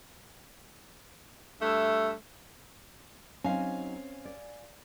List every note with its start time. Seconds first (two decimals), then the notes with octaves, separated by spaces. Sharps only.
1.61 G2 A3 E5
3.44 F#3 C4 C#4 D#4 F5 G#5
4.25 D5